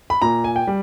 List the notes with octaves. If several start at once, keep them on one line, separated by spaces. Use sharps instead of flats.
B5
A#2 A#5
G#5
G5
G3